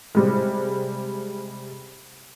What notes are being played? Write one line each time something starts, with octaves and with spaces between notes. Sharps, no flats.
C3 G3 G#3